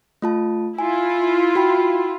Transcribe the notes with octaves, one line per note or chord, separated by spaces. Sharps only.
A3 F4 A5
E4 F4 G#5
F#4 G5 B5